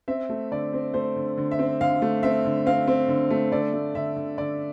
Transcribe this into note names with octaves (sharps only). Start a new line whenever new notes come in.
C4 E5
A3
D3 D5
C4
A3 C5
D3
D3
E5
C4
D3 F5
A3
C4 E5
D3
C4 F5
C4
D3
A3
D3 D5
A3
D3 E5
D3
D3 D5